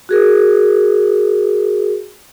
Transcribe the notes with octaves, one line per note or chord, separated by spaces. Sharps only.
F#4 G#4 A#4